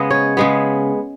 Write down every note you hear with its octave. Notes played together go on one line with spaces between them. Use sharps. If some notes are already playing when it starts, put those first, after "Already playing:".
Already playing: C#3 G#3 B3 D#5
C#5
C#3 G#3 B3